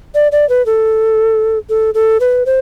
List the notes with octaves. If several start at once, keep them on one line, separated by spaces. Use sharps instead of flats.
D5
D5
B4
A4
A4
A4
B4
C5